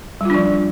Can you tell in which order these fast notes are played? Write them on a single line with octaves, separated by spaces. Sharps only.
G3 F4 D4 F3